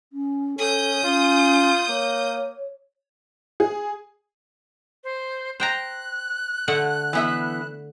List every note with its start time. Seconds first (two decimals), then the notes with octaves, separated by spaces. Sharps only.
0.13 C#4
0.58 C#4 A4 D#6 G6
1.04 C#4 F4
1.89 A#3 C#5
3.60 G#4
5.04 C5
5.60 C5 G5 A#5 F#6
6.68 D3 A3 F#5
7.13 E3 B3 E5